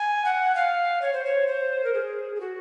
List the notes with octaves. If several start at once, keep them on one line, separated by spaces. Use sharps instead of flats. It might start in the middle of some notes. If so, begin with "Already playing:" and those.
Already playing: G#5
F#5
F5
C#5
C5
C#5
C5
A#4
G#4
G#4
F#4